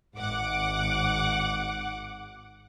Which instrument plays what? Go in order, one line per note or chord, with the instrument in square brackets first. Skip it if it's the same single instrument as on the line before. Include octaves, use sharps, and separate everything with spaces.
[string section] G#1 F#5 D6